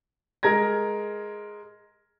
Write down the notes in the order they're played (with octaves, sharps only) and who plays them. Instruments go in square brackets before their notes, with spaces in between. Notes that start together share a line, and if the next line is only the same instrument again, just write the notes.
[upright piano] G#3 A#4 A#5 G#6 A#6